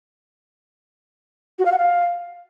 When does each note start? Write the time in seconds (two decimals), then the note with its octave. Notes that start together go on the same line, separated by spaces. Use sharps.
1.59 F#4
1.65 F5
1.72 F#5
1.78 F5